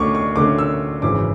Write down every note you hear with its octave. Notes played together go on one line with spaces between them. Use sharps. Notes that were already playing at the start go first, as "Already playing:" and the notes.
Already playing: D2 D3 A3 C#4 C#6 D6
C#6
D2 D3 A3 C#4 D6
E6
G#1 F#2 C#3 E3 D6